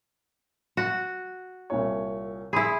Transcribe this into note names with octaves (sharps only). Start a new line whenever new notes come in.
F#4
C2 A#2 C#5
E4 G#4 B5 C6 D#6